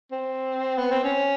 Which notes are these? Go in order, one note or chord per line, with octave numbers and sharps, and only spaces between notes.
C4
B3
C4
C#4